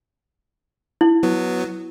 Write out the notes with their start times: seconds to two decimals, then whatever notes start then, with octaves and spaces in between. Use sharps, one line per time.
1.01 E4
1.23 F#3 B3